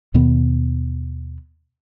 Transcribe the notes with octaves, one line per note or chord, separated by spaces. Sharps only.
D#2 B2 D#3 B3